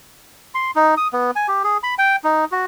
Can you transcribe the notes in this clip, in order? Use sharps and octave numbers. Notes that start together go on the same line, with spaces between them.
C6
D#4
D#6
B3
G#5
G4
G#4
B5
G5
D#4
F#4